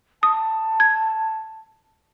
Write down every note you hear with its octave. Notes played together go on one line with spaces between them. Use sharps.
A5 D#6
G#6